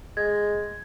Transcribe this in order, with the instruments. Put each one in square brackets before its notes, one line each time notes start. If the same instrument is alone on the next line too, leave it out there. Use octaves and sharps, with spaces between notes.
[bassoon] G#3 [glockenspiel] G#6